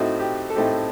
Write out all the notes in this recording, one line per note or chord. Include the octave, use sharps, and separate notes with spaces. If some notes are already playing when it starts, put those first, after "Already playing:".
Already playing: A2 A3 C4 D#4 F#4
G4
A4
A2 A3 C4 D#4 G4